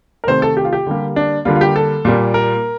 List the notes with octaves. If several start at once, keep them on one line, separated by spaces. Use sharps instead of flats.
A#4
C3 D#3 A3 C5
A4
G4
F4
G4
D3 G3 A#3
D4
D3 G3 A#3 F4
F4
G4
A4
A#2 G3 A#3
A#4